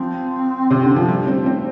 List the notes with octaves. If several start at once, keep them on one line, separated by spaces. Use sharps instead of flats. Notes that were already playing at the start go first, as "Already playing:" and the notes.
Already playing: F3 C4
C3
D3
F3
G3
C4
C4